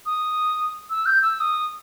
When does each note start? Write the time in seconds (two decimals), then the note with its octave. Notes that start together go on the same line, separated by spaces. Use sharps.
0.06 D#6
0.90 E6
1.06 G6
1.23 E6
1.40 D#6